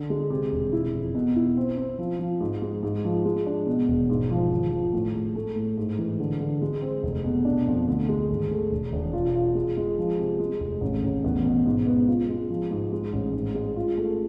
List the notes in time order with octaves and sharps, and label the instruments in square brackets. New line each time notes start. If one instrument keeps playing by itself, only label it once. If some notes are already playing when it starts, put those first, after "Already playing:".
Already playing: [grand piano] D3
G#3
C3
E1
E4
F2
B2
E4
C4
C4
F3
F3
G#2
G#3
G#2
F3
G#3
D4
B2
E1
G#2
F3
G#1
F3
A2
G#3
A3
A2
G#2
E3
D3
D3
G#3
C4
F1
B2
D4
F2
D2
G#3
G#1
A3
E1
E1
F4
F4
G#3
G#3
F3
C3
G#3
F1
A1
A1
E2
B2
G#2
B3
F4
G#3
F3
G#2
G#3
A1
G#2
G#3
F4
A3